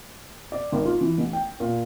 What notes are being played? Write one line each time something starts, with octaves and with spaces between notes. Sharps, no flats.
D5
G#1
F4
E3
A1
G5
A#2